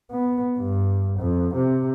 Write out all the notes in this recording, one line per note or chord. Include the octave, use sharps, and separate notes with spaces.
B3
G2
F2
C3